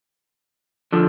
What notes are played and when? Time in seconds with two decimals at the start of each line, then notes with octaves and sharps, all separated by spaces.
0.93 D3 F3